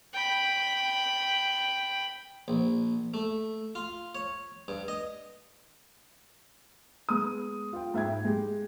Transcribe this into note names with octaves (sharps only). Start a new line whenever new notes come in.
G5 B5
A#1
A3
F4
C#5
G2
D#5
G#3 B3 D#6
F4 G5
G#2 E5 G5 G#6
G#3 G4